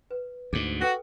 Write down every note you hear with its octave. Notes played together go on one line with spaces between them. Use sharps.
B4
D2 G#2 G#4
F#4 A4 B4 G5